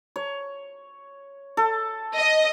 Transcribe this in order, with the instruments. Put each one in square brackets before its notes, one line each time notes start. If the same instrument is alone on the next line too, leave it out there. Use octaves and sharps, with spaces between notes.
[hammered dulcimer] C#5
A4
[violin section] D#5